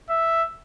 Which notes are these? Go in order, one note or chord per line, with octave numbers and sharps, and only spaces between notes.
E5